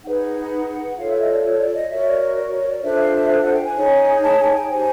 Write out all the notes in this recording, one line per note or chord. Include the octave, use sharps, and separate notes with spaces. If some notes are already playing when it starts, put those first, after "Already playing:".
D#4 G#4 B4 F#5
F#5
F#5
F#5
F4 A4 C#5 F5
E5
D#5
D5
C#5
D5
D#5
F#4 A#4 C#5 E5
D5
C#5
D5
C#5
D5
D4 F4 A4 C5 E5
F5
E5
F5
F#5
G5
G#5
D#4 G#4 C#5
A5
G#5
G5
D#4 G4 C5 G#5